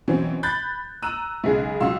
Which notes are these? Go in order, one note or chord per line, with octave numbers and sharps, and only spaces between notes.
B2 E3 F#3 C4 C#4
B5 F#6 G6 A6
A#5 E6 F#6 D#7
B1 C#3 G#3 G#4
C#2 F#3 F5 C6 E6